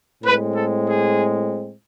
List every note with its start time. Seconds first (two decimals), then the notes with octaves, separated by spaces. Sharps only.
0.23 A2 G#3 C4 B4
0.55 A4
0.86 G#4